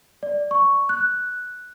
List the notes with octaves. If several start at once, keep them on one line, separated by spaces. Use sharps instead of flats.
D5
C#6
F#6